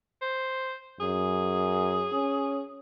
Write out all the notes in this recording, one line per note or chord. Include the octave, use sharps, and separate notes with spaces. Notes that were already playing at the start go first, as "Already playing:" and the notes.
C5
F#2 G#4
C#4